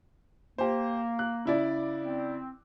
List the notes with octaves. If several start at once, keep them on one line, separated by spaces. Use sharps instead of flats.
A#3 G4 C5
F#6
C#3 E4 D5
C4